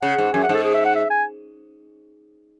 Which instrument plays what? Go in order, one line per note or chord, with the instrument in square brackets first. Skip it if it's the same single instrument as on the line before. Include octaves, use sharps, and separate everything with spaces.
[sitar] C#3 [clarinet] F#5
[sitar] G#2
[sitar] F#2 [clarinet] G#5
[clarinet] F#5
[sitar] G#2 [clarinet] A4
[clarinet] G#4
E5
F#5
E5
G#5